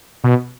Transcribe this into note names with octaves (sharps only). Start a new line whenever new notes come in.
B2